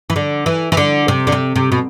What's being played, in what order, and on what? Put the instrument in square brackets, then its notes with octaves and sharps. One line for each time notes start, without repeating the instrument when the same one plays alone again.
[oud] E3
D3
E3
E3
D3
C3
D3
C3
C3
B2